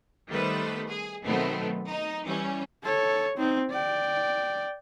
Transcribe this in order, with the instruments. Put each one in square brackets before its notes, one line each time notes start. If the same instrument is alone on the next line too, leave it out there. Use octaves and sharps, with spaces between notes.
[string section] D#3 G3 A3 B3 B4 C5
G#4
B2 D#3 F#3 A3 B3 C4
D#4
E3 G3 C#4
[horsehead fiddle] A4 C#5
C4 D#4
D5 G5